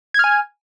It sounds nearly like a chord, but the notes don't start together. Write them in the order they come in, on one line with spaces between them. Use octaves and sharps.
G#6 F6 G#5